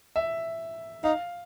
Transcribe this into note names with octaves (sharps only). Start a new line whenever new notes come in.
E5
D#4 F5